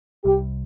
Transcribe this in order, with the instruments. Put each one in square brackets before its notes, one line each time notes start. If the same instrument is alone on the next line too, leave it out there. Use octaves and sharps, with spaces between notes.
[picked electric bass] C2 C3 G3 [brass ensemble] G4